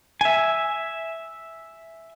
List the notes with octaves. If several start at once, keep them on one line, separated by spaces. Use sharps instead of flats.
E5 G#5